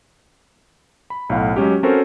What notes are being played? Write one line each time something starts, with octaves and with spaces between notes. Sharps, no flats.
B5
B1 A2 F5 F#5
F#3 G#3 C#4 G4
C4 C#4 F#4 A4 A#4 C5